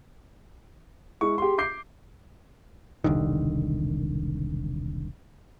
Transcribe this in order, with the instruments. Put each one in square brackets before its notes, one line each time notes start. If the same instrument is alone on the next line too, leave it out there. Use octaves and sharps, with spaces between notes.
[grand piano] G#3 E4 C#6
G4 G#4 C6
D6 G6 C7
[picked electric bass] E1 C2 D3 D#3